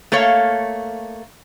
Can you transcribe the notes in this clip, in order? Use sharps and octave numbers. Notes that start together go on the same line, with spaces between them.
A3 A#3 A4 C#5 F5